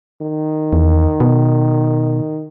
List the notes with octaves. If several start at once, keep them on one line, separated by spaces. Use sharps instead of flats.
D#3
E2
B2